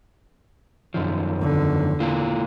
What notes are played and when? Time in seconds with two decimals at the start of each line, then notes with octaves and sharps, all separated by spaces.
0.94 F#2 D#3 F3
1.41 E2 D3
2.00 A#3 E4 F4